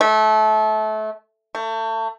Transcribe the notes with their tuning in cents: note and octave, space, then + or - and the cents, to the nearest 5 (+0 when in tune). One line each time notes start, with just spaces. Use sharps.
A3 -25
A3 +30